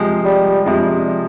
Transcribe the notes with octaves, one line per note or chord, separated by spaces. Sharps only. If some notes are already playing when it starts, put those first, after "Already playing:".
Already playing: C3 F3 G#3
G3
C3 F3 G#3